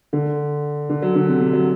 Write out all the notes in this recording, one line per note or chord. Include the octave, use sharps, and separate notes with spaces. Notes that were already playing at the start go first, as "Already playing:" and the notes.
D3
D3
F#3
D3
C3
C3
F#3